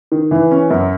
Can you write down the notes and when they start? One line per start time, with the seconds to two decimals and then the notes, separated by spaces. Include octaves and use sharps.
0.12 D#3
0.31 E3
0.51 C#4
0.71 F#2